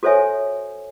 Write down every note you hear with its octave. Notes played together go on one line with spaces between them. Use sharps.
F#4 A4 C5 C#5 E5 G#5